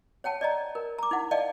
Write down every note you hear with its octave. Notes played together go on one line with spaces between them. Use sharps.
C#5 F#5 G5 A5
D5 D#5 A#5
A#4
A#5 D6
D#4 E4 F#5
D5 D#5 F5 G5 A5